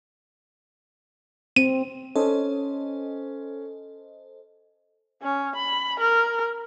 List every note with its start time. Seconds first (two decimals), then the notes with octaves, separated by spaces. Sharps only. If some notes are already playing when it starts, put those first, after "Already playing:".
1.56 C4 D#7
2.16 C#4 A4 C5 D#5
5.22 C#4
5.56 B5
6.00 A#4